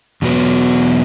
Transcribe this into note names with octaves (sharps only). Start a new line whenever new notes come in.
E2 B2 F#3 B3